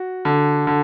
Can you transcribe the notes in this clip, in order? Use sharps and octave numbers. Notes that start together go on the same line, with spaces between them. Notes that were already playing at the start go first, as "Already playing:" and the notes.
Already playing: F#4
D3
D3